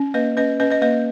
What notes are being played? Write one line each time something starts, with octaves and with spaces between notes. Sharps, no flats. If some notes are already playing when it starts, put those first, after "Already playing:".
Already playing: C#4
A#3 B4 D#5
C#4 B4 D#5
C#4 B4 D#5
B4 D#5
A#3 B4 D#5